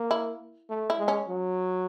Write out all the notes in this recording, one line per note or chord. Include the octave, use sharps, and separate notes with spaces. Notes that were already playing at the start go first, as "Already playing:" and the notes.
Already playing: A#3
E4
A3
E4
G#3
C#4
F#3